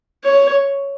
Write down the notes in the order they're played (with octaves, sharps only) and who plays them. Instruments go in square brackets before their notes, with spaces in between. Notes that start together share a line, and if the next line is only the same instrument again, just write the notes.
[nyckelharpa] C#5